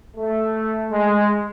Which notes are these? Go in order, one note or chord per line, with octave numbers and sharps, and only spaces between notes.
A3
G#3